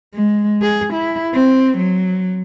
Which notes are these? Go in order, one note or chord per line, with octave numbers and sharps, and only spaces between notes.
G#3
G#4
E4
C4
F#3